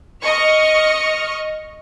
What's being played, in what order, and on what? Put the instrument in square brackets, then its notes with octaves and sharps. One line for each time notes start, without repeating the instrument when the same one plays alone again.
[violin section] D#5 C#6 F6